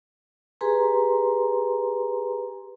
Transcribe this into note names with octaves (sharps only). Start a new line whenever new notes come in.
G4 G#4 B4 G#5 A#5 C6